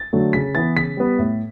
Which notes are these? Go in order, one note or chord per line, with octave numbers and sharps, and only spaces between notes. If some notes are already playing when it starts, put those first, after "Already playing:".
Already playing: A6
D3 F#3 A3
C#3 B6
E3 B3 A6
C#3 B6
G3 B3
A2